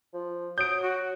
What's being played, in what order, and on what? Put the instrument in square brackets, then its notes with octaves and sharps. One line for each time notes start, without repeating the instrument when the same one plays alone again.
[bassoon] F3
[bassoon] F#3 [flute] D#6 [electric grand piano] G6 D7
[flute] F#4